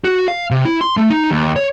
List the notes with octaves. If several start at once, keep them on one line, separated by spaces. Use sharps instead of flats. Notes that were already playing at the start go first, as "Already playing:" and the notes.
F#4
F5
C3
E4
C6
A3
D#4
D#2
C#5